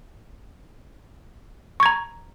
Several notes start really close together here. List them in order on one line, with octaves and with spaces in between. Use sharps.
C#6 G#6 A#5